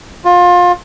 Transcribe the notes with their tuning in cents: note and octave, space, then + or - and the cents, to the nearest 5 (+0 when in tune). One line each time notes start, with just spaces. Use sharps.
F4 +25